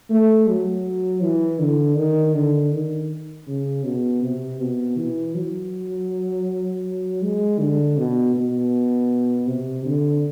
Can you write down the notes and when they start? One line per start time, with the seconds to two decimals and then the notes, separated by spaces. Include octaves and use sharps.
0.10 A3
0.48 F#3
1.23 E3
1.60 D3
1.97 D#3
2.35 D3
2.72 D#3
3.47 C#3
3.85 B2
4.23 C3
4.60 B2
4.98 E3
5.35 F#3
7.22 G#3
7.60 D3
7.97 B2
8.35 B2
9.47 C3
9.85 D3